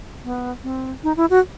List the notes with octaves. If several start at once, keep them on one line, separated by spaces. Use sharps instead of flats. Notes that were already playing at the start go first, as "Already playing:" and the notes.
B3
C4
D#4
E4
F#4